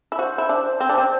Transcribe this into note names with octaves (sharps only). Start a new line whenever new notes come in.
E4
F#4 C5
E4
D4
C5
C4
D4
C4